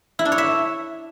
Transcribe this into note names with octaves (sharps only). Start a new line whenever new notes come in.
E4
D4
C#5
E5